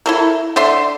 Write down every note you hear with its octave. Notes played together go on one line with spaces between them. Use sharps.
E4 A4 A#4
D3 A4 E5 C6